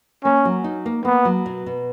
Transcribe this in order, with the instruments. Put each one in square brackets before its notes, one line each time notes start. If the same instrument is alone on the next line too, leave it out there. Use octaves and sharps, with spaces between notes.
[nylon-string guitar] A#3 [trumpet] C#4
[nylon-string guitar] F#3
D#4
A#3
[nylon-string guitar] A#3 [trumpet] B3
[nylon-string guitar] F#3
B2
B2